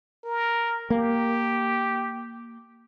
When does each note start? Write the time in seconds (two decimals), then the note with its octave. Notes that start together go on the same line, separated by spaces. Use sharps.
0.25 A#4
0.90 A#3 G4